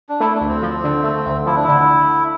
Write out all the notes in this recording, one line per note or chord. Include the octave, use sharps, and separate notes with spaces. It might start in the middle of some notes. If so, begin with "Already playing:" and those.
D4
A3 E4
D4
D2
C4
F3
D3
A3
D2
F3 E4
D4
D3 E4